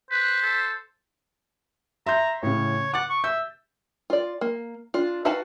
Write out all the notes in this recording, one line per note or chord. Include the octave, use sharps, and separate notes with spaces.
B4 C5 B6
A4
E5 A#5 C6 G6
A2 C#3 C#5
F#5 D6 A6
C#6
E5 G6
F4 D5
A#3
D4 F4
D#4 F#4 B4 F5 A5